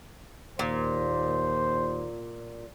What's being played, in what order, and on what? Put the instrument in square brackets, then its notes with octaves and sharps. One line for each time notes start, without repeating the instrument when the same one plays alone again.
[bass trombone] D#2 [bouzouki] A#2 [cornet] C5